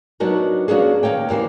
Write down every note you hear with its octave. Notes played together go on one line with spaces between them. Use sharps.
F#3 B3 D4 D#4 F#4 A#4
A#3 B3 C#4 D4 F#4 G#4
D#2 G#3 A#3 C#5 G5
D2 E3 A#3 C5